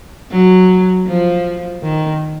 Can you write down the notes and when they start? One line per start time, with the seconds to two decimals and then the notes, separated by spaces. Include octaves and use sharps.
0.31 F#3
1.07 F3
1.82 D#3